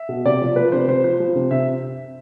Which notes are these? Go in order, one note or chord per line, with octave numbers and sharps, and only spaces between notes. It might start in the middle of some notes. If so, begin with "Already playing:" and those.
Already playing: E5
B2
C3 D5
F3
F3 B4
C3 C5
C3 C5
F3 C5
F3
C3
C3 E5